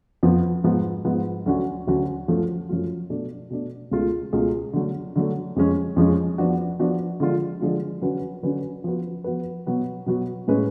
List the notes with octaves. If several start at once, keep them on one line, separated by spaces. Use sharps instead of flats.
F2 F3 B3
G#2 F3 B3
G#2 F3 B3
D2 D3 F#3 C#4 F#4
D2 D3 F#3 C#4 F#4
F#2 F3 A3 F4
F#2 F3 A3 F4
B2 A3 D4
B2 A3 D4
C#2 B2 A3 F4 G#4
C#2 B2 A3 F4 G#4
D3 F#3 A3
D3 F#3 A3
F2 F3 G#3 C#4
F2 F3 G#3 C#4
F3 B3 D4 F#4
F3 B3 D4 F#4
D3 F3 G#3 D4 F4
D3 F3 G#3 D4 F4
D3 F#3 C#4 F#4 B4
D3 F#3 C#4 F#4 B4
F3 B3 F#4 B4
F3 B3 F#4 B4
B2 F#3 B3 F#4
B2 F#3 B3 F#4
A2 G#3 C#4 G#4 B4